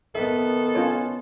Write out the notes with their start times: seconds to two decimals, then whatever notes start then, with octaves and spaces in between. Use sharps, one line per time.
0.15 D#3 B3 A4 E5
0.75 C#4 F4 C#5